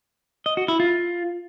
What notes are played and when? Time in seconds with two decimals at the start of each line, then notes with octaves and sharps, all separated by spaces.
0.46 D#5
0.57 F#4
0.68 E4
0.80 F4